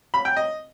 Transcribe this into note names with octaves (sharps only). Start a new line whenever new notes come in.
B5
G5
D#5